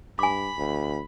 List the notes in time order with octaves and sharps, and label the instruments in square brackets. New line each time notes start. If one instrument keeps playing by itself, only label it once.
[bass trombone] G2 [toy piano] G#5 D6 [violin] B5
[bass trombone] D2